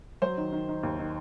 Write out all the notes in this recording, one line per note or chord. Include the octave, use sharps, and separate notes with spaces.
F#3 C5
D#3
D#3
D#3
D#2
D#3